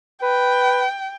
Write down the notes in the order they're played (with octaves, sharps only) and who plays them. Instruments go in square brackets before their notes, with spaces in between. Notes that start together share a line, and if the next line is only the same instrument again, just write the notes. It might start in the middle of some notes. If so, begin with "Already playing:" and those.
[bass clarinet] B4 [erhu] G5